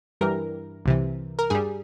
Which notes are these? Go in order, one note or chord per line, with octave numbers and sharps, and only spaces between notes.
G2 E3 G3 A#4
C2 C3 E3
A#4
G2 G3 G#4